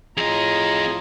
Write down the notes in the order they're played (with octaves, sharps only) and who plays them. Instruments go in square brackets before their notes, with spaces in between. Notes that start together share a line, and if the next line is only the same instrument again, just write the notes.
[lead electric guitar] F2 D#5 [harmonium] A2 F4 [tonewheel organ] G#4 [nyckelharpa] A#5